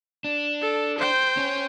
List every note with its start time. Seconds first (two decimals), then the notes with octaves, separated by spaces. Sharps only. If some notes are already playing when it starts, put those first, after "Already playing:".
0.25 D4
0.61 A4
0.99 C5 G5
1.37 C#4 C#5